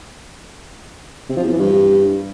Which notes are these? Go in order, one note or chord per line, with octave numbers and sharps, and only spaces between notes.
C3
F3
E2
E3
G2